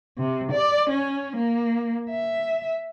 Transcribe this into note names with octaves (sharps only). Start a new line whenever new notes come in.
C3
D5
C#4
A#3
E5